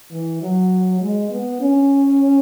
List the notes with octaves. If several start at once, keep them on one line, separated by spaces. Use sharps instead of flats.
E3
F#3
G#3
B3
C#4